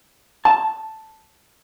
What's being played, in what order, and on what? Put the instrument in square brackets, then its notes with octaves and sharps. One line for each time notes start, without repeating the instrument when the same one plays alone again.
[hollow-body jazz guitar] A5